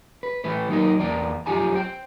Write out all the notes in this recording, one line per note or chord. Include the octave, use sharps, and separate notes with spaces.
B4
E3 A3 E4 B4
F#3 A#3 D#4 E4 F#4 A#4
E2 A#3 D5 G5 A5 A#5
F#2 F3 F4 G4 G#5 A#5
C5 G5